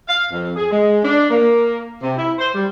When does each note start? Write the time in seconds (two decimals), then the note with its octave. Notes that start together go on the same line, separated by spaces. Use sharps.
0.08 F5
0.31 F2
0.56 G#4
0.71 G#3
1.04 D4
1.30 A#3
2.02 C3
2.17 E4
2.39 C5
2.55 G3